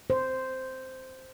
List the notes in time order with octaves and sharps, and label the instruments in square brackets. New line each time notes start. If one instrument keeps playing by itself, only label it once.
[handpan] C5